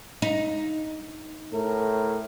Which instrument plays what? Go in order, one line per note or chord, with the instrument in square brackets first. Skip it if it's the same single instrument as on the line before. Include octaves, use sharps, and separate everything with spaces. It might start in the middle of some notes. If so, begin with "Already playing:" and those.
[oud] D#4
[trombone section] A2 A3 A#4